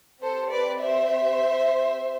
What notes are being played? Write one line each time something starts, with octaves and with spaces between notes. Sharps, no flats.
C4 G4 A4 C5
B4 D5
C5 E5